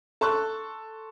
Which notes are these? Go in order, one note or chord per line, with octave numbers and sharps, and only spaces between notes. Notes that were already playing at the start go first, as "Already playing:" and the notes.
A4 A5 C6 C#6 E6 F#6